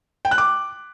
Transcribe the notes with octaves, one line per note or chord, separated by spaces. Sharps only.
G5
F#6
D6